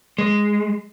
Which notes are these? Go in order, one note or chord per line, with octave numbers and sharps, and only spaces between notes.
G#3